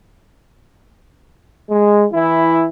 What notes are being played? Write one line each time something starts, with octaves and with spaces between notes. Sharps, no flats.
G#3
E3 E4